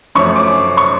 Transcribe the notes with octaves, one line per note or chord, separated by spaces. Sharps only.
F#2 F3 A3 C#4 C#6
D6
C#6